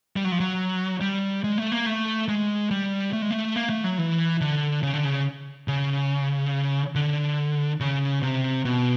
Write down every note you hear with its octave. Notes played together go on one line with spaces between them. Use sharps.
G3
F#3
F3
F#3
G3
G#3
A3
A#3
A3
G#3
G3
A3
G#3
A3
A#3
A3
F#3
E3
D3
C#3
D3
C#3
C#3
D3
C#3
C3
B2